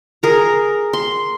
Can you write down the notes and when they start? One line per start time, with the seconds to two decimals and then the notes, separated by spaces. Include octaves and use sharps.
0.23 G#4 A#4 A#5
0.93 C6